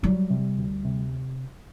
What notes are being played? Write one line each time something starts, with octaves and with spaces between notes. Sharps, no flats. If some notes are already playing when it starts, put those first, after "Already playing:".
F#3 G3
C3
D2
C3